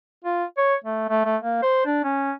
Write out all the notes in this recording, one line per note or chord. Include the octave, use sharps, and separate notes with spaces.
F4
C#5
A3
A3
A3
A#3
C5
D4
C#4